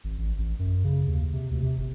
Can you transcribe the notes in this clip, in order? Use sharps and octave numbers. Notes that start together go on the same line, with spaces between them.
G#1
A1
A1
F#2
C#3
D#2
C3
D2
C3
G1